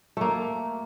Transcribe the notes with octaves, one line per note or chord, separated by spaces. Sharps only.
A3 A#3